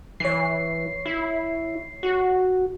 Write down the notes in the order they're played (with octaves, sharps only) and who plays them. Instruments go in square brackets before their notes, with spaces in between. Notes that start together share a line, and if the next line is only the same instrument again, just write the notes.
[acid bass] E3 [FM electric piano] C#5 C7
[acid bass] E4
F#4